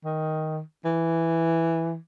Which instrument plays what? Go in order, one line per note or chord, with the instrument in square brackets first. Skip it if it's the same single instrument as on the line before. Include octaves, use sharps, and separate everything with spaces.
[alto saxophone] D#3
E3